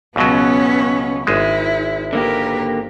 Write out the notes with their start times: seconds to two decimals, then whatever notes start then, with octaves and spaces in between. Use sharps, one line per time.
0.16 C#2 B2 F#3 B3 C#4
1.27 G#1 G#3 E4
2.13 D3 A#3 G4 A#4 B4